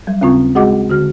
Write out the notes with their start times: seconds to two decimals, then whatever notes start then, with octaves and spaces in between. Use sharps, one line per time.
0.07 F#3 G3
0.21 D#2 C#3 C4 F4 C#6
0.55 G#3 F#4 G#4 D#5 F#5 D6
0.90 D3 F#4 F6